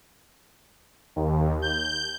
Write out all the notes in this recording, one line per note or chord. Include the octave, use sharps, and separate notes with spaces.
D#2
G6